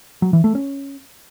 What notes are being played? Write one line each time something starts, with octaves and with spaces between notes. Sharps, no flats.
F#3
E3
A3
C#4